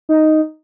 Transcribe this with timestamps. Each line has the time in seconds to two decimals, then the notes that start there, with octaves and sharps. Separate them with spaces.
0.09 D#4